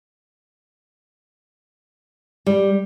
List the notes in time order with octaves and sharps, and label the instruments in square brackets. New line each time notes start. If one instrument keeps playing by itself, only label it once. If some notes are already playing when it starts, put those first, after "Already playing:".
[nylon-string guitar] G3